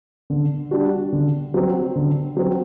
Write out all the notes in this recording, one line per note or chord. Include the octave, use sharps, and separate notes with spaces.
D3
G3 D4 F#4
D3
F#3 C4
D3
F#3 C4